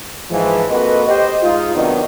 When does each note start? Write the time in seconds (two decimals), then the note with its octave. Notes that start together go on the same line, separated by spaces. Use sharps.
0.29 G#2 E3 F3
0.69 A#3 C4 F#4 A4 B4 D#5
1.07 G4 C5 D#5
1.42 G#2 G#3 D#4 F4
1.74 C3 D#3 F#3 B3 D4 D#4